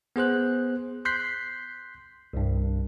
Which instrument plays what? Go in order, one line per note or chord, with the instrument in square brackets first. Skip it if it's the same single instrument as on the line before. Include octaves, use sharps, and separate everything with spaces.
[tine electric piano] B3 G#4 C5 F#6
C6 F#6 G6 B6 C7
C2 G2